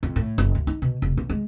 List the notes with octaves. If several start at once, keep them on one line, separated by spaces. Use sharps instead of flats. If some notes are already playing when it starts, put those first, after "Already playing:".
F2
A2
F#1
D2
D#4
B2
F1
B1
G#3